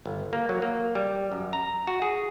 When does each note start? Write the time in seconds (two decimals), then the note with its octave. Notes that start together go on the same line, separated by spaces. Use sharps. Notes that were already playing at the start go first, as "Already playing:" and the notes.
0.06 G1
0.33 A#3
0.49 F#3
0.62 A#3
0.95 G3
1.32 F#2
1.53 A#5
1.87 F#4
2.02 G#4